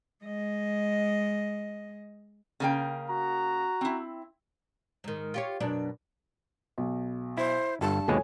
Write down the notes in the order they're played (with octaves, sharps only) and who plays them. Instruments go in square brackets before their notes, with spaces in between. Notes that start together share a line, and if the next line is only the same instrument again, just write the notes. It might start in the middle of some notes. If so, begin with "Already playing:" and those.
[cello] G#3 D#5
[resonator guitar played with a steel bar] C#3 A#3 G5
[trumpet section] F#4 A#5
[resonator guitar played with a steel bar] C4 E4
[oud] G#2 D#3
F4 G4 C#5
F#2 B2 D4
[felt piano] B1
[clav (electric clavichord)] E4 [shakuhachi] C5
[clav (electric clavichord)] G1 [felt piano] G2 [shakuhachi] A5
[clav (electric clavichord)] D#2 B2 G#3 [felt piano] A4 C#5 G#5